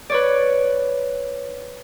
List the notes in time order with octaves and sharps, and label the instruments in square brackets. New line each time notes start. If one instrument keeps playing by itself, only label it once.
[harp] B4 C#5 D5